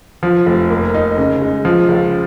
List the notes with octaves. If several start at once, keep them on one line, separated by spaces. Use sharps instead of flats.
F3
F1
A#3
D#4
C#3
G#3
F3
C#2